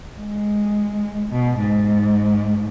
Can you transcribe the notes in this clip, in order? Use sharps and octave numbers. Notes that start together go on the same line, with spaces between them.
G#3
B2
G#2